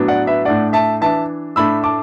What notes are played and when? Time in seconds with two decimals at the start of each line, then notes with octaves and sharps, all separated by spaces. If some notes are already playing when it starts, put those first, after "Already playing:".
Already playing: A2 F#3 B3 D4
0.08 D5 F#5
0.27 B4 E5
0.45 A2 A3 D4 D5 F#5
0.73 E5 A5
1.01 E3 D4 E5 A5
1.56 A2 A3 D4 B5 E6
1.84 A5 D6